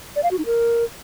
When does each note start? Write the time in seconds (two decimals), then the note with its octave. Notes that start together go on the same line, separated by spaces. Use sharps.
0.16 D5
0.23 F5
0.31 F#4
0.39 D#4
0.46 A#4